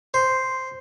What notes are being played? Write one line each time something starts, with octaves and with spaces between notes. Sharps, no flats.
C5